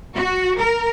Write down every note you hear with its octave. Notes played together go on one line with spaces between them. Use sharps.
F#4
A#4